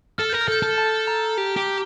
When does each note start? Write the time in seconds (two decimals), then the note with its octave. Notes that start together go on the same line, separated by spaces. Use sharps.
0.18 A4 F6
0.30 A#4 G6
0.41 F6
0.48 A4 G6
0.62 A4 F6
0.78 A5
1.07 A#5
1.38 G4
1.57 G4